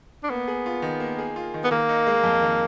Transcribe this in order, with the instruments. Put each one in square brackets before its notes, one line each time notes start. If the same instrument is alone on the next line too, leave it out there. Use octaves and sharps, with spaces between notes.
[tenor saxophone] D4
[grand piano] A#3 [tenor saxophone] B3
[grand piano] G#4
F4
D#3
A#3
G#4
F4
D#3
[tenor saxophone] B3
[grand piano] D#3 [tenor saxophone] A#3
[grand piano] D#4
G#3
F2
D#3